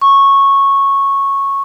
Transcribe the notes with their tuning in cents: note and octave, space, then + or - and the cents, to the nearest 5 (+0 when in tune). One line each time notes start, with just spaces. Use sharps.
C#6 -10